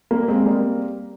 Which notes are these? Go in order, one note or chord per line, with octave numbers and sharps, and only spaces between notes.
G3 A#3
G#3 C4
G3 A#3